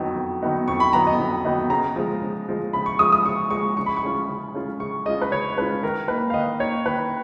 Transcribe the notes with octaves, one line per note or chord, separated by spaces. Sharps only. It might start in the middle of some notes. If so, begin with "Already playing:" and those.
Already playing: F2 D#3 F#3 B3 D#4
F2
D#3 F#3 B3 D#4
F2 C#6
B5
D#3 F#3 B3 D#4 A#5
D#5
F2
D#3 F#3 B3 D#4
C#3 A#5
F3 G#3
C#3
F3 G#3
C#3 B5
C#6
F3 G#3 D#6
D#6
C#3 C#6
F3 G#3 C#6
C#3 C#6
B5
C#6
G#3 C#4 F4
C#3
G#3 C#4 F4
C#3 C#6
G#3 C#4 F4 D#5
B4
C#3 C#5
G#3 C#4 F4 B4
D#3 A#4
A#3 D#4 B4
F5
D#3 D#5
A#3 D#4 C#5
D#3 B4